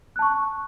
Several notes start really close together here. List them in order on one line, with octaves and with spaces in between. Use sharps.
F#6 A5 C#6